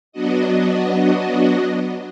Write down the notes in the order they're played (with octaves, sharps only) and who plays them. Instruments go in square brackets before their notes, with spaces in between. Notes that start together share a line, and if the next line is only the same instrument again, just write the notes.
[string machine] F#3 B3 D4 F#4 D#5